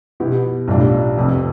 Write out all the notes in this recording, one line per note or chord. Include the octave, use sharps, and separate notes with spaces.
B2 B3 E4 G4
B1 A2 G3 D4 F4
F1 F2 C3